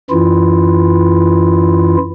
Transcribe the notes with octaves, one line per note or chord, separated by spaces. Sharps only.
F#2 E3 E4 F4